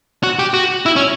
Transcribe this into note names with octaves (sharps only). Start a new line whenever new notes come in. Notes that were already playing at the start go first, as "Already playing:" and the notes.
F#4
G4
F#4
E4
C#4